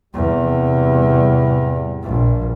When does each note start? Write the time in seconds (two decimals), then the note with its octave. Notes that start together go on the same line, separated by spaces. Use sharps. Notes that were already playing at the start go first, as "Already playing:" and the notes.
0.14 E2 A2 C3 G3
2.03 A#1